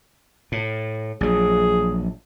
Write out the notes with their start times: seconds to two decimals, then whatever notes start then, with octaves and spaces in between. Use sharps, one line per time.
0.52 A2
1.21 A#1 F#3 G#4